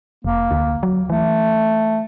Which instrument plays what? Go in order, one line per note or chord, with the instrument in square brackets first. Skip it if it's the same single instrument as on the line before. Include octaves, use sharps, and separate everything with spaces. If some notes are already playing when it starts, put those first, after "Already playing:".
[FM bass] F1 [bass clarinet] A#3
[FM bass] D2
F#3
[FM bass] E3 [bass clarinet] A3